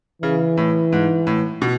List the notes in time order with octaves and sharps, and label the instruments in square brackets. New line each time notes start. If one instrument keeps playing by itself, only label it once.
[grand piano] C#3 [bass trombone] E3
[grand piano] A2
G#2
A2
B2